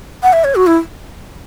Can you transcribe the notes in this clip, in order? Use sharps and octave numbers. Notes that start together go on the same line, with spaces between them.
F#5
E5
C#5
F#4
E4